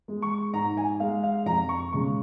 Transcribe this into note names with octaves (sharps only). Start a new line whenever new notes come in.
G#3
C#6
G#2 A#5
G#5
G#3 F5
F5
F2 A#5
C#6
C#3 G#3 C#6